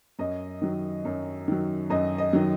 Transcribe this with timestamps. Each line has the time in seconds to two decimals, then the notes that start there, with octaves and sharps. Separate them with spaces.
0.19 F#2 D#5
0.61 D#3 F#3
1.05 F#2
1.48 D#3 F#3
1.90 F#2 D#5
2.18 D#5
2.33 D#3 F#3